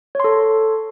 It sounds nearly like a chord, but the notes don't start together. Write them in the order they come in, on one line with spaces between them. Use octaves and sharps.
C#5 C6 A4